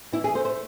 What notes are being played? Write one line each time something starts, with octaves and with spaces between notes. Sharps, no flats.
E3 E4
G#4
A3 C5
C5